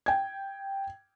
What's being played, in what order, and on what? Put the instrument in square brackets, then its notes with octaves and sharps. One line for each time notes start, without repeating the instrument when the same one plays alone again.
[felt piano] G5 G#6